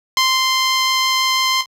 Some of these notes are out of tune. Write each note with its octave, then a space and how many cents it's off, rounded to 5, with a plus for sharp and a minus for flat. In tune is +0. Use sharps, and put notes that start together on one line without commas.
C6 -5